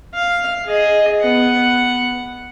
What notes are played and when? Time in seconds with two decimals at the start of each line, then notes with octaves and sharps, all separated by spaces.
0.15 F5
0.65 G#4 D#5
1.21 B3 F#5